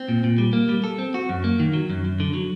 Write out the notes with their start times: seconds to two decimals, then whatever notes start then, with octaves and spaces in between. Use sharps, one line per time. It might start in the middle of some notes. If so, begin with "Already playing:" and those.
Already playing: C4
0.08 A#2
0.24 A#2
0.38 G3
0.53 A#3
0.69 G3
0.84 A4
0.99 C4
1.14 F#4
1.29 F#2
1.44 A#3
1.60 D#3
1.73 F#3
1.90 F#2
2.05 F#2
2.20 D3
2.34 F#3